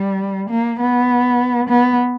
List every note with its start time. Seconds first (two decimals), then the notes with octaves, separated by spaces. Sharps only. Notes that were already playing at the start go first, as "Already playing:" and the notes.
Already playing: G3
0.50 A#3
0.79 B3
1.69 B3